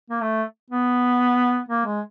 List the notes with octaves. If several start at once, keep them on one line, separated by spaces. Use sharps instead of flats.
A#3
A3
B3
A#3
G#3